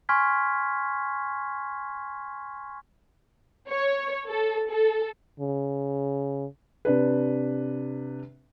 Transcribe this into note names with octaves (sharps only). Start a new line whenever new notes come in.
G#5 C6 C#6 F6 G#6 B6
C#5
A4
A4
C#3
C3 D4 B4